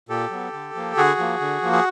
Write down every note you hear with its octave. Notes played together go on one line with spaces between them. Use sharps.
A#2 G4 A4
F#3 B3
D3
F3 A#3
D3 F#4 G#4
F3 A#3
D3
F3 A#3
G#4